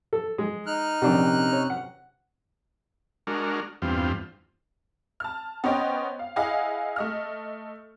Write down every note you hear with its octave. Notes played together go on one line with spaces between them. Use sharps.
A4
G#3
D#4 F6 F#6
A#1 C3 C#4 D4 F#5
C#5
F#5
G#3 D4 F#4 A#4
E2 G2 C4 F4
A5 F6
B3 C#4 C5 D#5 G5
F5
E4 G#4 D#5 F5 F#5 G#5
A3 D#5 F6